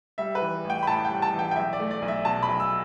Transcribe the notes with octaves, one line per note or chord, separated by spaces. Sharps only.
G3 E5
B4
E3
A1
G5
B5
A2 A5
G5
G3
A5
E3
G5
G5
B1 E5
D5
A3
D5
B1
E5
B2 A5
B5
B1
E6